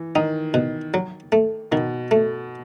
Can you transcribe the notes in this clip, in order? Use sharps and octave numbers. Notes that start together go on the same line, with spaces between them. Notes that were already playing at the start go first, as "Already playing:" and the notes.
Already playing: E3
D#3 D#4
B2
F#3
A3
B2 D#3
A3